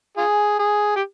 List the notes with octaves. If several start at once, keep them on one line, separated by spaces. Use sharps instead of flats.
F4 G#4
G#4
G4